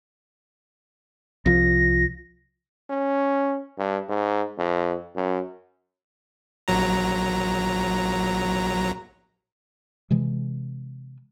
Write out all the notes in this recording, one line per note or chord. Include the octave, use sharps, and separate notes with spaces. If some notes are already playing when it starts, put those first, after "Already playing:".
C2 F3 A#6
C#4
G2
G#2
F2
F#2
A#1 F#3 A#5
C3 E3 G#3